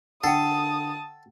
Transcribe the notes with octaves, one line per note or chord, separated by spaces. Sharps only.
D3 A4 F#5 G5 A5 D#6